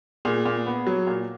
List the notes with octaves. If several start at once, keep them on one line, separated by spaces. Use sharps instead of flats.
A#2 G#4
A#2
B3
F#3
A#2